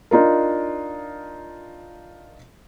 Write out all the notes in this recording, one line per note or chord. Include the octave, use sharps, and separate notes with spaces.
D4 D#4 F4 A#4